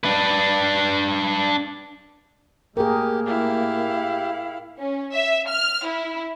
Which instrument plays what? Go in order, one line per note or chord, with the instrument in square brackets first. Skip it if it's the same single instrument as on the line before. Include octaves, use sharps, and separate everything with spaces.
[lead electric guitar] D4 B4
[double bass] A2 A#3 [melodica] G4 [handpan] G#4 A#4
[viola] E4 F5 [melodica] G4
[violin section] C#4
E5
F6
E4